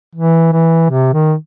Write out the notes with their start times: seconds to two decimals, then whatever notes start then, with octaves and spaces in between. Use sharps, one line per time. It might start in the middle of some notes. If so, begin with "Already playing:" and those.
0.15 E3
0.53 E3
0.90 C3
1.14 D#3